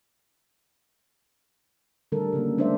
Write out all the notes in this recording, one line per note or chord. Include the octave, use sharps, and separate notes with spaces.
D3 D#3 G3 A3 A4 A#4
C#3 F#3 A#3 B3
G#3 D4 A#4 C5 D5 E5